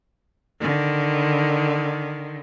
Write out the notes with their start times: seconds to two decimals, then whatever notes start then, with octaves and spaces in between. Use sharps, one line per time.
0.59 D3 D#3